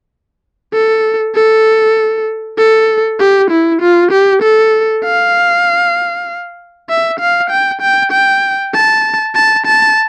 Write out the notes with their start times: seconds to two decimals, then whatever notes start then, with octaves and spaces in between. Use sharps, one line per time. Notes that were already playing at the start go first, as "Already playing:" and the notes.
0.73 A4
1.35 A4
2.58 A4
3.19 G4
3.51 E4
3.82 F4
4.12 G4
4.42 A4
5.05 F5
6.89 E5
7.20 F5
7.50 G5
7.81 G5
8.12 G5
8.74 A5
9.35 A5
9.66 A5